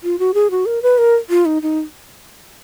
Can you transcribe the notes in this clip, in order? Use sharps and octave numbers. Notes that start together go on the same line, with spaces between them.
F4
F#4
G#4
F#4
A#4
B4
A#4
F4
D#4
D#4